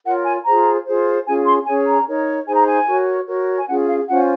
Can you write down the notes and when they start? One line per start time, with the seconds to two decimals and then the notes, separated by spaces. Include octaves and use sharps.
0.05 F4 A#4 C#5 F#5
0.26 G#5
0.45 F4 G#4 C5 A#5
0.86 F4 G#4 C5
1.26 C#4 F4 G#4 G#5
1.46 C6
1.66 C#4 G#4 C#5 G#5
1.87 A#5
2.07 D#4 A#4 C#5
2.47 D#4 G#4 C5 G#5
2.56 A#5
2.66 G#5
2.87 F#4 A#4 C#5
3.27 F#4 A#4 C#5
3.57 G#5
3.68 C#4 F4 G#4 F#5
3.87 F5
4.08 C#4 F4 C5 F#5